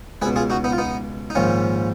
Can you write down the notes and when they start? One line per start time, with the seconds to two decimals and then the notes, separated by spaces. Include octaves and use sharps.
0.22 C#2 G#4 B4
0.25 B2
0.36 F4 G#4
0.50 D#4 F#4
0.64 B3 D#4
0.72 F4
0.78 B3 D#4
1.30 D#4
1.35 A#1 G#2 D#3 C#4 F4